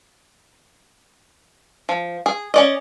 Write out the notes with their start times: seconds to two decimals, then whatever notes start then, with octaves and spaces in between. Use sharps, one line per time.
1.89 F3
2.26 G#4
2.54 C#4 D5 D#5